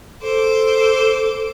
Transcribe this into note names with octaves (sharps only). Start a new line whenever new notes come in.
A4 C5 D6